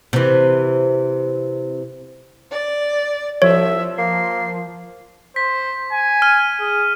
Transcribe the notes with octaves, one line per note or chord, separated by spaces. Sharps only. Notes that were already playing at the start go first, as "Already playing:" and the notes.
C3 E3
D5
C2 F3 C#5 E5
A#3 C7
C5 B6
G#5
F6 D#7
G#4